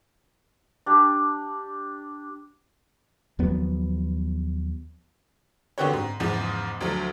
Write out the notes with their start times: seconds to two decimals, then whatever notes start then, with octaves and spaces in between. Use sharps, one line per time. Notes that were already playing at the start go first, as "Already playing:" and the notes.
0.86 D4 G4
3.39 D#2 F3 F#3 B3
5.78 D3 B3 C4 F#4 G4 C#5
5.93 G#2
6.20 E2 G#2 C#3 F3
6.81 D2 F3 F#3